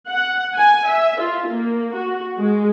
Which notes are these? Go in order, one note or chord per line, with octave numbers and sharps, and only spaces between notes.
F#5
G#5
E5
F4
A#3
F#4
G#3